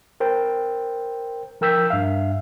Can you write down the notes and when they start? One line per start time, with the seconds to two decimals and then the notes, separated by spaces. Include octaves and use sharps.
0.20 A#4 C5 G5
1.61 F3 A#4 G5 E6 G6 B6
1.90 G2 E5 F5